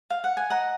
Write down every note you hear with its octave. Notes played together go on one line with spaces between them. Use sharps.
F5
F#5
G#5
D#5 F#5 A#5